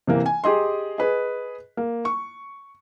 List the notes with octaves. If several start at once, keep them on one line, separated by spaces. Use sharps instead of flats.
C3 E3 A#3
G#5
G4 G#4 D#5 C6
G#4 B4 D#5
A#3
C#6